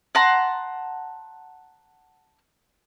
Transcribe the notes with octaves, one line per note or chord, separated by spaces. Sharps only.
F#5 A5 A#5 C6